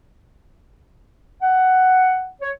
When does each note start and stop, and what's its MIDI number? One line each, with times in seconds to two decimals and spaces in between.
1.42 2.30 78
2.42 2.51 73